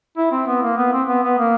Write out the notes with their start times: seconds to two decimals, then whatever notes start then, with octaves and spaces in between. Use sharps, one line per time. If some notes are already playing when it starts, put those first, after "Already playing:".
0.17 E4
0.32 C4
0.47 B3
0.63 A#3
0.78 B3
0.93 C4
1.08 B3
1.23 B3
1.39 A#3